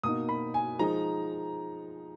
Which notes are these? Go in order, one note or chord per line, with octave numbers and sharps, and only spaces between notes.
B2 A#3 D#4 D#6
B5
G#5
F3 G#3 D#4 A#5